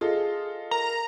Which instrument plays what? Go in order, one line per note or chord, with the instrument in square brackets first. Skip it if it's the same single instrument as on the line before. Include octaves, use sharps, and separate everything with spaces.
[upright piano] F4 A4 D#5 [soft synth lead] G#4
[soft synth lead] A#4 [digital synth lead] A#5